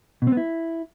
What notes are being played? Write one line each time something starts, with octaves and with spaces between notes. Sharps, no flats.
B2
C4
B3
E4